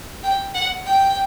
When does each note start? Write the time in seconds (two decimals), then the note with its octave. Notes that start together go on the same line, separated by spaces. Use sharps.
0.23 G5
0.54 F#5
0.86 G5